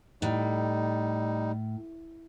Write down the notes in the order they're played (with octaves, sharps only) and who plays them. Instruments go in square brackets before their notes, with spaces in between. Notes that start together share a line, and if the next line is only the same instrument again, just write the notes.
[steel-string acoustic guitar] A2 [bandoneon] G3 D#4